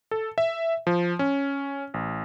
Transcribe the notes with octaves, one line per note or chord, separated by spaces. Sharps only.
A4
E5
F3
C#4
A1